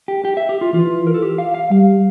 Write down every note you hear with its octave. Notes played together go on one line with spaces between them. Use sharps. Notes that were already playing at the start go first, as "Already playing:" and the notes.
G4
G4
E5
G4
F4
E3 F4
A#4
A4
G4
F5
F5
G3 F5